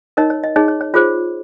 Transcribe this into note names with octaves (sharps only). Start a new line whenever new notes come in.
D#4 A#4 C#5 D#5
C#5
D#5
D#4 G#4 C#5 D#5
C#5
C#5
F4 G#4 C5 C#5